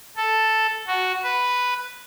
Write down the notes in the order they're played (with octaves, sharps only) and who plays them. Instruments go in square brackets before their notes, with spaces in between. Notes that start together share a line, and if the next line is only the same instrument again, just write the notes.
[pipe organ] A4
F#4
B4